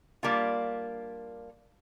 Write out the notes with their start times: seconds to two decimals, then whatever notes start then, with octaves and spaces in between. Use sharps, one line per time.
0.23 G3 A#3 D4 F4